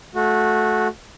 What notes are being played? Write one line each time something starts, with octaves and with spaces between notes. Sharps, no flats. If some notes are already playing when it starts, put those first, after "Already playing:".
A3 F#4